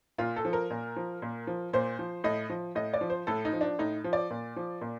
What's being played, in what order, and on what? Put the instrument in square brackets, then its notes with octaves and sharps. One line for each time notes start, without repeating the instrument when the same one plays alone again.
[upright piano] A#2 F4
A4
F3
A#4
A#2
F3
A#2
F3
A#2 C5
F3
A2 D#5
F3
A2 D#5
D5
F3
C5
A2 A4
D#4
F3
D4
A2 D#4
F3
D5
A#2
F3
A#2